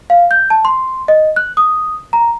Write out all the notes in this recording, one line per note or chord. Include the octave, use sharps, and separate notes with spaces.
F5
G6
A5
C6
D#5
F#6
D#6
A#5